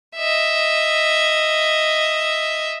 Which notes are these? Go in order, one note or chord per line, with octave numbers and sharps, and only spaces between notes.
D#5 E5